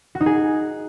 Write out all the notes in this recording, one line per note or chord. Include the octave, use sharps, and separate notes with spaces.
F#4
D#4
G#4